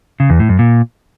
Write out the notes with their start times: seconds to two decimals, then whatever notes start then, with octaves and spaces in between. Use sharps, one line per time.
0.20 C#3
0.30 E2
0.39 A2
0.49 F#2
0.59 A#2